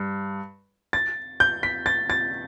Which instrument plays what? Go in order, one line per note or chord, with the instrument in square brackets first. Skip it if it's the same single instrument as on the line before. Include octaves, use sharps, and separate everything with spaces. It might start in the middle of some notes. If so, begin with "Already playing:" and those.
Already playing: [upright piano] G2
[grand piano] A6
G6
B6
A6
A6